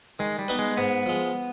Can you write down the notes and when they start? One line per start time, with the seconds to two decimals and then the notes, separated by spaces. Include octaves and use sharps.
0.19 D#3 G#3
0.39 G3
0.48 B3 D#4 B4
0.59 G#3
0.77 G#2 B3
1.06 F3 G#3